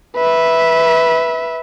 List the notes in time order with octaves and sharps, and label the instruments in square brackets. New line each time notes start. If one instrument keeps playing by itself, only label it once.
[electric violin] B4 E5